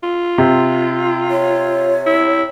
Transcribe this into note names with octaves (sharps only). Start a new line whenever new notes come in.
F4
C3
C#5
E4